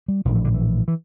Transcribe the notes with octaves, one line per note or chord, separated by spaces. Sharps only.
G3
A#1 A2 F3
E3
D3
E3
E3